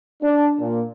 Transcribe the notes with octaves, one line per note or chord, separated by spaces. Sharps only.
D4
A#2